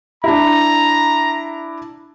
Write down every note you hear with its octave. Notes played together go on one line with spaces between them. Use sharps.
D4 E4 A#5